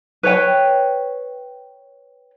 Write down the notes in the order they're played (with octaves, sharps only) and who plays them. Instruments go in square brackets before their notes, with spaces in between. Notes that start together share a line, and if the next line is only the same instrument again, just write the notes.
[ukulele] B4 C#5 G5